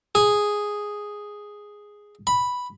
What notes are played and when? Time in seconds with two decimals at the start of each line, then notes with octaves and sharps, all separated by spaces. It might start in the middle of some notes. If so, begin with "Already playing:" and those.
0.15 G#4
2.27 B5